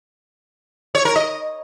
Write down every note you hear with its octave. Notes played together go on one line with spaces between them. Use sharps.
C#5
A#4
D#5